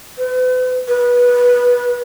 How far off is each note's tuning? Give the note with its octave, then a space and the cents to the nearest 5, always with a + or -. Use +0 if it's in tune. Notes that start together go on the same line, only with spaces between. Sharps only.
B4 +45
B4 -20